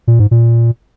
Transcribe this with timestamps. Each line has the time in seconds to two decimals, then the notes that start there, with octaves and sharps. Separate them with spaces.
0.08 A#2
0.19 G#2
0.31 A#2